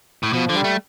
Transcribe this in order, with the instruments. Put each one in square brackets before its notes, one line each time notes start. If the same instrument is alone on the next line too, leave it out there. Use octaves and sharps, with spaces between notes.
[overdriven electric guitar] A2
[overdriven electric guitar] B2 [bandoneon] F3
[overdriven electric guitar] D3 [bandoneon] G3
[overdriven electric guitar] A3